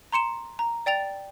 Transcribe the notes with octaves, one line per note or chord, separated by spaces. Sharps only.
A#5 C6 C#7 E7
A#5
D5 G5 A6 F7